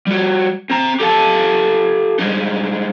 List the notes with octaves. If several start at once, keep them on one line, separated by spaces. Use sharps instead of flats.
G3 F#4
C4 A#5
G4 A4 F5 A5
G3 G#3 D#4